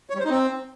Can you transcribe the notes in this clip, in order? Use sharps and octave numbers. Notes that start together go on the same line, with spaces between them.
C#5
G3
C5
D#4
C4